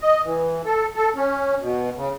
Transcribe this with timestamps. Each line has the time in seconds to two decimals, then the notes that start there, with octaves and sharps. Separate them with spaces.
0.01 D#5
0.25 E3
0.65 A4
0.96 A4
1.16 C#4
1.61 B2
1.97 C#3